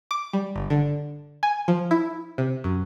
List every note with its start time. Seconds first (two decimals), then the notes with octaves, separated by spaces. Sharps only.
0.11 D6
0.33 G3
0.56 G1
0.70 D3
1.43 G#5
1.68 F3
1.91 E4
2.38 C3
2.64 F#2